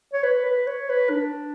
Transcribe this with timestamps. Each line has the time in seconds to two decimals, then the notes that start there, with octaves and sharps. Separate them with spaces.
0.13 C#5
0.23 B4
0.45 B4
0.67 C#5
0.89 B4
1.11 D4